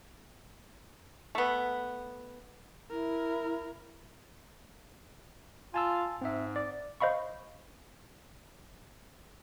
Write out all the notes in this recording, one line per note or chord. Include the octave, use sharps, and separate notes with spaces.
A3 B3
E4 A#4
F4 G#5 A5 E6
G#2 C4 E5
D5
C5 D#5 F5 B5 C#6